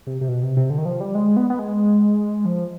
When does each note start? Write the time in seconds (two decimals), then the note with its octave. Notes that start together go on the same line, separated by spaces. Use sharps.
0.07 C3
0.21 C3
0.28 B2
0.43 C3
0.57 C3
0.70 D3
0.78 D#3
0.85 F3
1.00 G3
1.15 G#3
1.37 B3
1.50 B3
1.59 G#3
2.45 F3